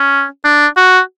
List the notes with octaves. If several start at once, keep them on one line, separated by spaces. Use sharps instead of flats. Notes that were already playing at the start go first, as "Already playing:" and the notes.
Already playing: C#4
D4
F#4